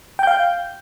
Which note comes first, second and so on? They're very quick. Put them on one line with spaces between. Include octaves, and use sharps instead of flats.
G5 G6 F5